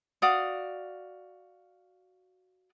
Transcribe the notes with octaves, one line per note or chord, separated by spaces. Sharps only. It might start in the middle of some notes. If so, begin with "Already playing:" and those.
F#4 D5 F5 D#6